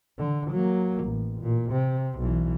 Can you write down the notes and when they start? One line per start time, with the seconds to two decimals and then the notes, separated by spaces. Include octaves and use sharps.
0.18 D3
0.51 F#3 A#3
1.04 A1
1.41 A#2
1.72 C3
2.18 B1 E3